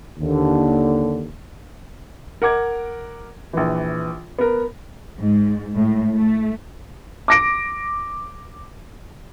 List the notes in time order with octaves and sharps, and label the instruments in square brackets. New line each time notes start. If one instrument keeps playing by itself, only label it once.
[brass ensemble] D#2 D3
[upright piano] A#4 F#5 D6 G#6
A#1 E3
B3 A#4
[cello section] G#2
A2
A3
[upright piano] D6 A#6 D7